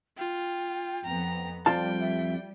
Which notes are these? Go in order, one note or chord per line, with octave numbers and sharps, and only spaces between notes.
F4 G5
F2 B3 A#5
F2 G3 F4 D5 G5 A5
E5